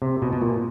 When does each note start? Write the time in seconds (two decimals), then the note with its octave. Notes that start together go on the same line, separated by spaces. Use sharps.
0.02 C3
0.22 B2
0.33 B2
0.42 A#2